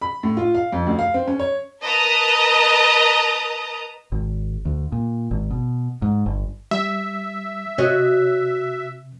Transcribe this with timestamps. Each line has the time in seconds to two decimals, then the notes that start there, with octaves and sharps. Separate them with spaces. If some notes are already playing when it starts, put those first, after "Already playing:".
0.01 B5
0.23 A2
0.37 F4
0.55 F5
0.73 F2
0.87 D2
0.99 F5
1.14 C4
1.28 C#4
1.40 C#5
1.82 A#4 B4 D#5 A5 A#5 D#6
4.12 G#1
4.65 D2
4.92 A#2
5.31 G#1
5.51 B2
6.02 G#2
6.26 G1
6.71 G3 E5
7.78 C3 F#4 C#5 D#5